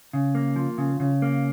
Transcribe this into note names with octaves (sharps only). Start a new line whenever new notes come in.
C#3
A#3
F3
C#3
C#3
A#3